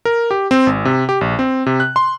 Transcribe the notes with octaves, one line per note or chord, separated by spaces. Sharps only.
A#4
G4
C4
G#1
C3
G4
A#1
C4
C3
F#6
C6